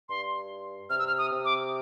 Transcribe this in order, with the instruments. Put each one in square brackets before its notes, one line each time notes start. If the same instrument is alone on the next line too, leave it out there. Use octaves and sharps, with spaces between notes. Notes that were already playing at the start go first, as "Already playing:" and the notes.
[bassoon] G2 [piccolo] C6
[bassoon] C3 [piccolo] F6
[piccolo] E6
F6
D#6
[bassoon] C3
[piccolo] D6